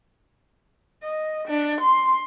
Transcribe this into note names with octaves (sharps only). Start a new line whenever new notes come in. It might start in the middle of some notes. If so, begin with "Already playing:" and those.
D#5
D4
C6